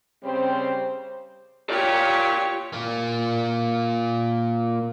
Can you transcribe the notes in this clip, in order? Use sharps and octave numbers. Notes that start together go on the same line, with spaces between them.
C#3 G3 C4 C5
F4 G4 C#5 D5
A#3 F4